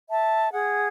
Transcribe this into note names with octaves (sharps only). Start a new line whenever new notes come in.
E5 A5
G#4 F#5